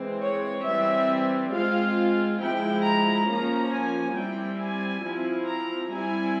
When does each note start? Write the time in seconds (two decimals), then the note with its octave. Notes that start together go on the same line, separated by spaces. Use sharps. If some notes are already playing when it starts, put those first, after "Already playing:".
Already playing: E3 G#3 C4
0.21 C#5
0.65 E3 G3 C4 E5
1.52 G#3 C4 F4 F5
2.40 F3 G#3 E4 G5
2.85 A#5
3.29 F3 A#3 C#4 A#5
3.72 G#5
4.16 G3 C4 E4 G5
4.60 G#5
5.04 F3 C4 E4
5.48 A#5
5.92 G3 C4 E4 G#5